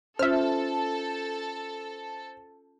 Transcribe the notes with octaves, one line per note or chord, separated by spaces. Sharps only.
C#4 F4 A4 C5 E5 F6